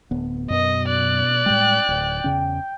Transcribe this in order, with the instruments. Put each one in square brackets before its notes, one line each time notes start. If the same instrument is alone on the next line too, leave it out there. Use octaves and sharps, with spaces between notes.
[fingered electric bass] D1 B3
[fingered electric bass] F#2 [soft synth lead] B2 [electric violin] D#5
[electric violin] D5 F#6
[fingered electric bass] A2 G3 G#3 [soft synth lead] G5
[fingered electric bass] D1
E2 C#3 C#4